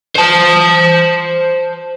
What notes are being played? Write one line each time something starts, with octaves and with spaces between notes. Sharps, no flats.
C5 A5